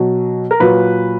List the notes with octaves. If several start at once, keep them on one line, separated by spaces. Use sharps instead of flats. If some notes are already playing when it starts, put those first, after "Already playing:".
Already playing: B2 F#3
A#4
A#2 F#3 B4